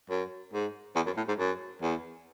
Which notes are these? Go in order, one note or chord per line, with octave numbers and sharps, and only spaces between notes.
F#2
G#2
E2
F#2
A2
G#2
F#2
E2